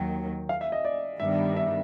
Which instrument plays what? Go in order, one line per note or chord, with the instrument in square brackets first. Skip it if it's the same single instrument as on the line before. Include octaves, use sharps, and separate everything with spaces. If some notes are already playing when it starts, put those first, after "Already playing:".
Already playing: [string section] D#2 D#3 F#3 [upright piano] G5
[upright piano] F5
E5
D#5
D5
[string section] G2 D#3 G3 B3 D4 [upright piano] E5
[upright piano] E5